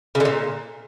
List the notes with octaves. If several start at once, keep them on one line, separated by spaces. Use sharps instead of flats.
C#3
D3
A#2